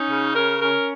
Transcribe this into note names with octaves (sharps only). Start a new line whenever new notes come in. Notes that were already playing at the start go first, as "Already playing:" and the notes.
Already playing: C#4 D#4
C#3
C#4 A#4
C#4 A#4